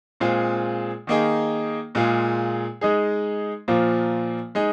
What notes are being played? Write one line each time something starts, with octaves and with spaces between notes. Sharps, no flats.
A#2 G#3 C4 F4 G#4
D#3 A#3 D#4 G#4
A#2 G#3 F4 G#4
G#3 D#4 G#4
A#2 F3 A#3 F4
G#3 D#4 G#4